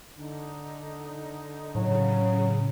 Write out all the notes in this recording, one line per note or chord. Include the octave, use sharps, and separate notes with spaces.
D3 D#4
A2 C#3 F#3